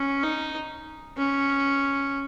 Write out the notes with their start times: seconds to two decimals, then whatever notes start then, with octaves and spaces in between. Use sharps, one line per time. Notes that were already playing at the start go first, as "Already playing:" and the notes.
Already playing: C#4
0.24 D#4
1.18 C#4